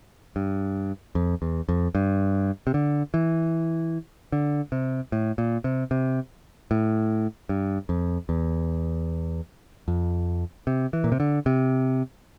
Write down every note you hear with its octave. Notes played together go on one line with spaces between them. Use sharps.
G2
F2
E2
F2
G2
C3
D3
E3
D3
C3
A2
A#2
C3
C3
A2
G2
F2
E2
F2
C3
E3
A#2
C3
D3
C3